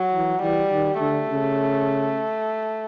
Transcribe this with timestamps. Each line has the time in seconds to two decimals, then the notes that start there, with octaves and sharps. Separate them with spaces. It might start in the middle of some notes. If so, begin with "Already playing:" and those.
Already playing: F#3
0.13 E3
0.42 E3 G3
0.71 D#3
0.99 D3 A3
1.29 C#3